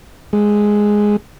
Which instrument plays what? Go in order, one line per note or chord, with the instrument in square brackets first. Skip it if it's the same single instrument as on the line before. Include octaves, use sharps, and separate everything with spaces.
[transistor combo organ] G#3